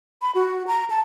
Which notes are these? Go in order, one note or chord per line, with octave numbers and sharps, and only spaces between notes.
B5
F#4
A#5
A5